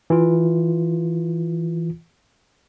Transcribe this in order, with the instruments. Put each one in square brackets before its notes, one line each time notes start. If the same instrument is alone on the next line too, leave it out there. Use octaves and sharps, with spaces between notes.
[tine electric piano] E3 F4